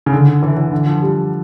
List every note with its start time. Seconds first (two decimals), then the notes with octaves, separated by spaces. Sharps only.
0.06 C#3
0.12 D3
0.42 E3
0.57 E3
0.72 D3
0.86 F3
1.02 G3